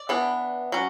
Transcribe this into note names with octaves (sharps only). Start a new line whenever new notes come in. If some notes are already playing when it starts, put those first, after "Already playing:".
Already playing: D5
E3 B3 D4
F#3 C#4